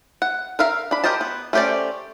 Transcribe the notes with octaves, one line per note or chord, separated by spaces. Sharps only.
F#5
A#4 E5 F5 A#5
D4 B5
G4 A#4 C5 D#5 A5
B3
A3 C#4 G4 C5 D5